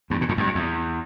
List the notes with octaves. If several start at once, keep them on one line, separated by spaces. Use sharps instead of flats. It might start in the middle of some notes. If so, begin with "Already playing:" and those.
E2 G2
A#2
F2 A2
E2 G2
F2
E2